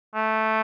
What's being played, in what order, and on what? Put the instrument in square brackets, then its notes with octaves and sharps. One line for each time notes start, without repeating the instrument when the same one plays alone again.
[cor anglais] A3